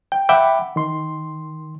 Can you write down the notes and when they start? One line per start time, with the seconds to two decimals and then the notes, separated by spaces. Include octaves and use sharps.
0.12 G5
0.29 E5 F#5 G5 B5 D6
0.76 D#3 C6